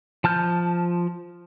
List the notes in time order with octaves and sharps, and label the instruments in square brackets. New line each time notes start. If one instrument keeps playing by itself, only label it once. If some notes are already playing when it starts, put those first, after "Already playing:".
[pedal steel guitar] F3 A5 F6 G6